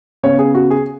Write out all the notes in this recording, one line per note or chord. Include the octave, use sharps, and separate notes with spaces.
C#3 B3 C#5
G#4
F#4
G#4